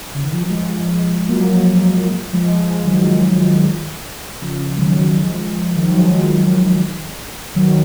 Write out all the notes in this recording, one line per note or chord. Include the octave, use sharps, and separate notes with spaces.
C#3
D#3
F3
F#3
F3 G#3
F#3 A#3
F3 G#3
F3 G#3
D#3 F#3
C#3 F3
G#3
D#3 F#3
F3 G#3
D#3
F3
F#3
F3 G#3
D#3 F#3